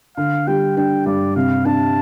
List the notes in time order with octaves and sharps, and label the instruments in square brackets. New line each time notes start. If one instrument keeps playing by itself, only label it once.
[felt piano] D3 [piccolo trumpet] F5
[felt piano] G3 [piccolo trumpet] G5
[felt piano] D4 [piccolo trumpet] G5
[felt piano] G2 [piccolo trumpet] D5
[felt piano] C3 [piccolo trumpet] F5
[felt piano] D4 [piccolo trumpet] A5